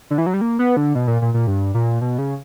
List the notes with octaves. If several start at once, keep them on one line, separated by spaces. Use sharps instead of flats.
D3
E3
F#3
G3
A#3
B3
D3
B2
A#2
A#2
A#2
G2
A#2
B2
C#3